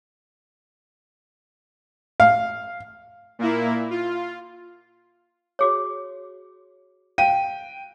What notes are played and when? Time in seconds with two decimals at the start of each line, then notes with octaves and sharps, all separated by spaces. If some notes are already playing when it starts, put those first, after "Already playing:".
2.20 F5
3.39 A#2 A#3 E4
3.91 F4
5.59 F#4 G#4 C#5
7.18 F5 G5 D#7